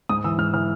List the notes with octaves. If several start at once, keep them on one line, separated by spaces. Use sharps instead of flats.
G#2 D#6
E3 E6
G#2 F6
E3 F6